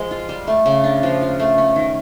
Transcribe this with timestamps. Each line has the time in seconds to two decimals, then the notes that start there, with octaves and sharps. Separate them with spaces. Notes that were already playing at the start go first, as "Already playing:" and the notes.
Already playing: F3 G#3
0.11 F4
0.29 G3
0.47 A3
0.66 C#3
0.84 D4
1.03 F3
1.21 F4
1.39 A3
1.58 C#4
1.76 D#3